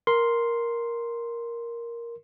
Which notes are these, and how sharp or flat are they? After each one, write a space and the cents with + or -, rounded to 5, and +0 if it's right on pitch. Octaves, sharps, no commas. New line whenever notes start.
A#4 +5 C6 +0